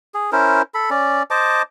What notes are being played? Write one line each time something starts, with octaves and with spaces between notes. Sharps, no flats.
G#4
C#4 E4 A#4 C5
A4 B5
C#4 D5
C5 D#5 A5 D6